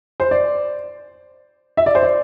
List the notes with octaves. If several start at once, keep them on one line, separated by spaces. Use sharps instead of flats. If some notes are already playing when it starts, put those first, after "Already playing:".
C5
D5
E5
D5
C5
D5